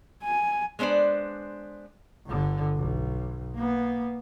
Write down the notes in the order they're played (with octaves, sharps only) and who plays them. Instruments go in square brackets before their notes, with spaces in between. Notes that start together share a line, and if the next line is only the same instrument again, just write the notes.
[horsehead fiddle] G#5
[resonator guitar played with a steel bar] G#3 B3 D4 C5 D5
[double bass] G1 D3
B1
A#3 B3